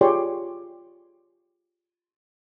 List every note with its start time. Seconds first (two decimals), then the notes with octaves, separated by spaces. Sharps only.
0.01 F4 G4 G#4 C#5 D5 C6